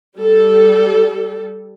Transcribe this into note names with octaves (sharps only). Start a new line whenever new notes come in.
G3 A4